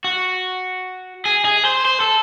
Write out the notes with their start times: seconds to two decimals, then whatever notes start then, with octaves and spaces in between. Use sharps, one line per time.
0.04 F#4
1.25 G#4
1.45 G#4
1.65 C5
1.85 C5
2.00 A4